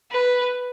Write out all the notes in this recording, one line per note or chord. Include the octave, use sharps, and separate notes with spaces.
B4